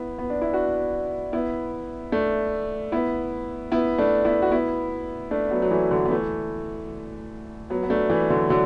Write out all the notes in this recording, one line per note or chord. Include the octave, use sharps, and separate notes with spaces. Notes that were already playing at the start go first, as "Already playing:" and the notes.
Already playing: B3 E4
B3
D4
E4
D4 F#4
B3 E4
A3 D4
B3 E4
B3 E4
A3 D4
B3 E4
F#4
B3 E4
A3 D4
F#3 B3
F#3
E3 A3
D3 F#3
B3
E3 A3
F#3 B3
B3
A3 D4
E3 A3
D3 F#3
D3 F#3